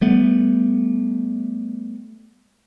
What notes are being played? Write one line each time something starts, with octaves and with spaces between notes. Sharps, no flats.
G3 A3 B3